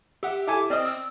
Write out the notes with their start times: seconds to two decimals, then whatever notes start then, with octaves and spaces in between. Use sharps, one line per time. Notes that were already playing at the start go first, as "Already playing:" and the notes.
0.23 G4 E5 F#5
0.47 E4 A4 G#5 D6
0.70 C4 D5 D#5 F6
0.84 E6